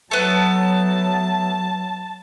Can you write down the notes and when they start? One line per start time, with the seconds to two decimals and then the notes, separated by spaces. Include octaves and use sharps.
0.11 F#3 A3 B3 A5